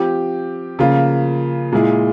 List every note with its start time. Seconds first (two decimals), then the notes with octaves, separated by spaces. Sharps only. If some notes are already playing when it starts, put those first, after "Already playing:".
Already playing: F3 C4 G4
0.79 C#3 F3 A#3 F4
1.72 A#2 G#3 E4 G#4